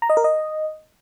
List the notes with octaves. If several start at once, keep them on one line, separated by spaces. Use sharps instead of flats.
A#5
D#5
A#4
D#5